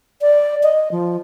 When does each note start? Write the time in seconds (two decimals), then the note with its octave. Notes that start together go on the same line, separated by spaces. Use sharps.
0.22 D5
0.63 D#5
0.92 F3